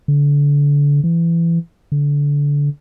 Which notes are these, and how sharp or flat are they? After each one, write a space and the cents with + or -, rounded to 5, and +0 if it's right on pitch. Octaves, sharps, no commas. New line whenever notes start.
D3 -30
E3 +25
D3 -25